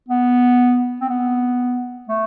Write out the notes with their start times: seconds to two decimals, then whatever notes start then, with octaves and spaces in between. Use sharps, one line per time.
0.09 B3
1.01 C4
1.09 B3
2.09 A3